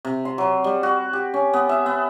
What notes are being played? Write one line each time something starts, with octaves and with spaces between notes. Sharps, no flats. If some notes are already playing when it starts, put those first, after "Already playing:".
C3
C6
F#3
G3
F#4
G4
C#4
B3
E5
B3